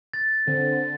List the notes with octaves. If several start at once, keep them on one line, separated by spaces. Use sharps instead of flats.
A6
D3 C4